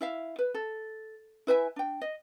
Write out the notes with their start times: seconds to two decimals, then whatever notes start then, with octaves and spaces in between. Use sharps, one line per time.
0.01 E4 E5 F5
0.39 B4
0.54 A4
1.47 E4 B4 E5 G#5
1.76 D4 G5
2.01 D#5